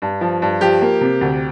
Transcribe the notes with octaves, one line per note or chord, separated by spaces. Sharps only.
G2
F3
G2
F3 G4
A#3
C3
D2